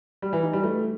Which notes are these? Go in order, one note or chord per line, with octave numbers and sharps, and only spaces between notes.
G3
E3
D#4
G3
A3